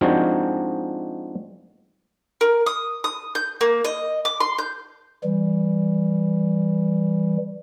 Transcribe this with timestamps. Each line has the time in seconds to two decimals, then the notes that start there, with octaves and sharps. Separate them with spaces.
0.01 F3 G#3 C4 D4 D#4 F#4
2.41 A#4
2.66 D#6
3.04 D#6
3.35 G6
3.61 A#3
3.85 D#5
4.25 D6
4.40 C6
4.58 G6
5.23 E3 G3